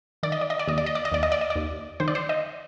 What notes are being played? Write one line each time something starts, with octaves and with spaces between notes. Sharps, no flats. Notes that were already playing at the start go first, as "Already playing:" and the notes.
D#3 D5
D#5
D5
D#5
D5
D#2 D#5
D5
D#5
D5
D#5
D#2 D5
D#5
D5
D#5
D5
D#2
D#3 C5
D5
C5
D#5